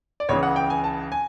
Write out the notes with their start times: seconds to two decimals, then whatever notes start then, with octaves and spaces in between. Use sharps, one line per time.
0.20 D5
0.29 C#2 C#3 E3 C#5
0.43 F#5
0.56 G5
0.70 G#5
0.84 A5
1.12 G#5